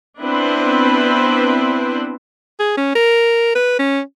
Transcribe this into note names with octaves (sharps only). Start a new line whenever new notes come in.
B3 C4 D4 E4 B4 C5
G#4
C#4
A#4
B4
C#4